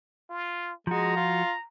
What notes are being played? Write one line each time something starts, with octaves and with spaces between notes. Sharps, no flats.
F4
F3 G#3 F#4 A#5
F4